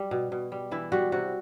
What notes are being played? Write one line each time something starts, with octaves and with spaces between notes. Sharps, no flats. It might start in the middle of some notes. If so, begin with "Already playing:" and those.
Already playing: G3
B2
B2
G3
E3 E4
G3 F#4
C3 F#4